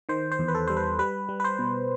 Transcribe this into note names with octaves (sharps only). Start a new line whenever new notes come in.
D#3 C5
C5
E2
B4
A4
G3 C5
B4
G3 B4
G3
B4
C5
B2